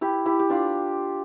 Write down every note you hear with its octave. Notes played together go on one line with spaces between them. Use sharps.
E4 G4
E4 G4
G4
D4 F4